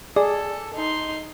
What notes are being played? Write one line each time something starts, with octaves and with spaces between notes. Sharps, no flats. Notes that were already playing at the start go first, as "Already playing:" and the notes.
G#4 A4 D5
D#4 C6